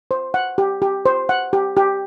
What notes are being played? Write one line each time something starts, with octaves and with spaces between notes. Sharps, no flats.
C5
F#5
G4
G4
C5
F#5
G4
G4